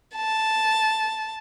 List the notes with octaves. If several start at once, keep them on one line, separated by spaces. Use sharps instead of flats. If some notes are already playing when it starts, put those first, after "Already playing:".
A5